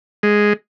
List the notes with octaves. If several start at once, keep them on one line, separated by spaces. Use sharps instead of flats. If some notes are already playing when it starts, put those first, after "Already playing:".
G#3